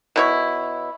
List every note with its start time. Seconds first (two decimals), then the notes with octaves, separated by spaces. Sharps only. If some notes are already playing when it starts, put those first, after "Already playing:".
0.16 B2 E4 C#5